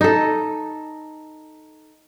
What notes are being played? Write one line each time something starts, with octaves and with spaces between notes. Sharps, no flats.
D#4 A4